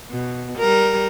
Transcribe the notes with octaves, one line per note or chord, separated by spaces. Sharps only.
B2
G3 A#4